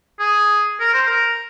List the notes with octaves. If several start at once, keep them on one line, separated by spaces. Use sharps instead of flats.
G#4
A#4
C5
A#4